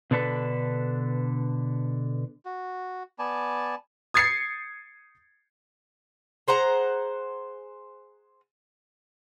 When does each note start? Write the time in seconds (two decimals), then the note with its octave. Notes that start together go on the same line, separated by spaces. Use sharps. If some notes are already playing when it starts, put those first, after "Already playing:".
0.11 B2 D3 D4 A4 B4
2.45 F#4
3.19 B3 D5 G#5 A5
4.14 D#6 G#6 A6 C7 C#7
6.48 G#4 C5 F#5 A#5